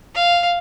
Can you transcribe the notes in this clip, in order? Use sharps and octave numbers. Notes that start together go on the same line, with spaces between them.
F5